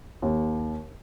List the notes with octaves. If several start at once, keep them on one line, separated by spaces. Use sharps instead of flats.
D#2